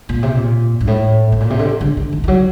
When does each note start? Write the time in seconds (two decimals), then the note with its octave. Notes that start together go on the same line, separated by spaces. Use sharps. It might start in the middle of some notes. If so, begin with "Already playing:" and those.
0.09 A#2
0.23 C3
0.37 A#2
0.81 G2
0.87 A2
1.32 A2
1.40 A#2
1.50 C3
1.59 D3
1.65 C3
1.81 D3
1.97 D3
2.13 D#3
2.24 D#3
2.28 F#3